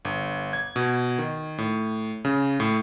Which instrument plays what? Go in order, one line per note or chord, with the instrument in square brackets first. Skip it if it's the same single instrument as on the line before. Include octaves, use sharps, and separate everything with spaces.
[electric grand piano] G1
G#6
B2
D#3
A2
C#3
A2